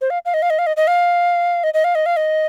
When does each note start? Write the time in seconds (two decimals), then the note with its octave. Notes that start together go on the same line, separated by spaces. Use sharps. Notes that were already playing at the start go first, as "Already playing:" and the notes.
0.01 C5
0.10 F5
0.25 F5
0.34 D#5
0.42 F5
0.50 D#5
0.59 F5
0.67 D#5
0.77 D#5
0.87 F5
1.64 D#5
1.74 D#5
1.84 F5
1.95 D#5
2.06 F5
2.17 D#5